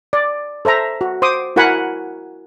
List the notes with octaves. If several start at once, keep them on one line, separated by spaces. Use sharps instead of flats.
D5
A4 C5 E5 A#5
F#4
C5 C6 D6 D#6
E4 F#4 A#4 F#5 G#5 B5